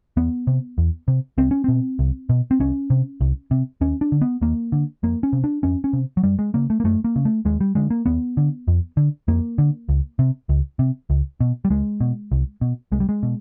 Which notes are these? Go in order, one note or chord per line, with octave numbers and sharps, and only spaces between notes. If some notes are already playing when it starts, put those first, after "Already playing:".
E2 B3
C3
E2
C3
C2 C4
C#4
B2 C4
C2
B2
C4
C2 C#4
C3
C2
C3
D#2 C#4
D4
D3
B3
D#2 A#3
D3
F2 A#3
C#4
C3
D4
F2 C#4
C#4
C3
F#3
F#2 G3
G#3
C#3 A#3
A3
A#3
F#2 A3
A#3
C#3
A3
D#2 G#3
G3
D3 G#3
A#3
D#2 B3
D3
F2
D3
F2 A#3
D3
C#2
C3
C#2
C3
C#2
B2
G3
C#2 G#3
B2
C2
B2
C2 G#3
G3
G#3
B2